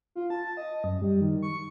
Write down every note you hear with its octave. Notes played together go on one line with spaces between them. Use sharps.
F4
A5
D#5
F#2
G3
D#3
C#6